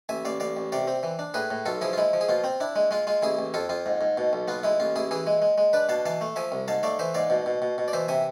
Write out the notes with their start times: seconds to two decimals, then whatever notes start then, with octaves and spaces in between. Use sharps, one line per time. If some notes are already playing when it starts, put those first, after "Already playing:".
0.09 A1 E5 G#5
0.25 A1 D5 F5
0.40 A1 D5 F5
0.57 A1
0.72 C3 D5 F5
0.87 C4
1.03 E3
1.19 D4
1.34 A2 G#4 B4
1.50 A2
1.66 B1 F4 A4
1.81 F3 E4 G#4
1.93 F4
1.98 G#3 E4
2.13 F3
2.21 G#4
2.29 B2 F4
2.44 C4
2.60 D4 E4
2.76 G#3
2.91 G#3 F4
3.07 G#3 F4
3.22 A1 E4 G#4
3.39 A1
3.54 F2 F4 A4
3.69 F2 F4
3.86 G#2
4.01 G#2
4.18 B2
4.33 B1
4.48 B3 F4
4.63 G#3 E4
4.80 A1 F4
4.96 A1 E4 G#4
5.11 E3 E4 G#4
5.27 G#3
5.42 G#3
5.58 G#3
5.73 D4 B4 D5
5.89 B2 F5 A5
6.06 E3 F5 A5
6.21 A3
6.36 F3 E5 G#5
6.52 C2
6.68 G#2 F5 A5
6.83 A3 D5 F5
6.99 E3 C5 E5
7.14 G#2 D5 F5
7.30 B2
7.46 B2
7.62 B2
7.78 B2
7.88 D5
7.93 E3 C5 E5
8.08 C3 E5 G#5